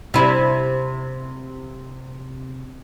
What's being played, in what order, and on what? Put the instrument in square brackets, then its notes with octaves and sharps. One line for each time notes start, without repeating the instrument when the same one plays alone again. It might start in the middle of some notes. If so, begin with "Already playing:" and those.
[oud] C3 E4